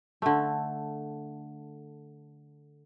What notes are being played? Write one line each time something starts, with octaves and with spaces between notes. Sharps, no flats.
D3 A3